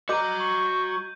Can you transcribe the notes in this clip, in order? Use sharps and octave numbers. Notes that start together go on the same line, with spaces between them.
F#4 D#5 A#5 C6 D6 G6 D#7
C#6